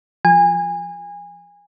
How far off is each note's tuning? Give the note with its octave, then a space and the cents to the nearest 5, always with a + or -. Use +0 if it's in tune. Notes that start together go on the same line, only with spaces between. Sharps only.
F3 +0 G#5 -25